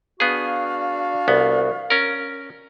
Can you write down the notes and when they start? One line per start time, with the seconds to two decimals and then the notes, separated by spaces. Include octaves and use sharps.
0.20 B3 D4 F#4 G#4 F5
1.28 C2 B3
1.90 C#4 A#4